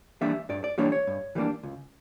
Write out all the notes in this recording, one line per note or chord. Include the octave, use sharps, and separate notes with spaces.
E3 G3 A#3 D4 E5
G2 D5
D5
E3 G3 A#3 D4 C#5
C#5
G2
E3 G3 A#3 D4
C#2